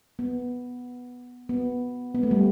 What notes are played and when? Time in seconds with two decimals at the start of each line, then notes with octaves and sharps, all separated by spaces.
0.19 B3
1.49 B3
2.15 B3
2.23 A3
2.31 G3